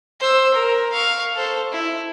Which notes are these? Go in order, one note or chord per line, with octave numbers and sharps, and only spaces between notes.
C5 E6
A#4
F5 C#6
A4 C5
E4